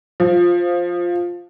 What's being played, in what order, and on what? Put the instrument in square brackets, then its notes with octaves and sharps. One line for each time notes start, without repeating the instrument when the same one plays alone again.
[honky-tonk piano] F3